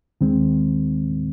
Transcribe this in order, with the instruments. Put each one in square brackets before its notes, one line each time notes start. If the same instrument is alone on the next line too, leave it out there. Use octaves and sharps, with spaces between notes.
[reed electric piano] D#2 D#3 G#3 C4